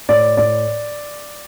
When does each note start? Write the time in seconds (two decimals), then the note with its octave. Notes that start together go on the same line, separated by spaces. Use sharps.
0.09 A2 D5
0.37 A2 D5